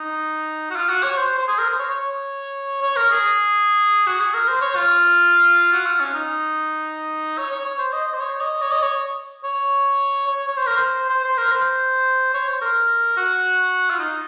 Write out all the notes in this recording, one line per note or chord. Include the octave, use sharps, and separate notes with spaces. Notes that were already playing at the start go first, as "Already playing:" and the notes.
Already playing: D#4
F#4
F4
F#4
C#5
C5
C5
G#4
A#4
C5
C#5
C#5
C#5
A#4
G#4
F#4
G#4
A#4
C5
C#5
F4
F#4
F4
C#4
D#4
C#5
C#5
C#5
C5
D#5
D#5
C5
C#5
D#5
C#5
D#5
C#5
C#5
C#5
C#5
C5
A#4
C5
C5
C5
A#4
C5
C#5
C5
A#4
F#4
F4
D#4